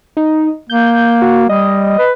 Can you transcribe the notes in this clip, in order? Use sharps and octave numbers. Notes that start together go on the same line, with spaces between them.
D#4
A#3 G6
F#4
G3 D#5
B4